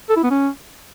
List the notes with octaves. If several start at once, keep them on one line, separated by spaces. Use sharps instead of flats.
A4
E4
B3
C#4